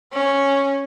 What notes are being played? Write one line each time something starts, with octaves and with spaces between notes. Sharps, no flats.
C#4